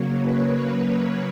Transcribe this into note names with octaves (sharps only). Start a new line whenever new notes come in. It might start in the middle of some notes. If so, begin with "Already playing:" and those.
Already playing: C#3 F#3 A#3 C#5
B4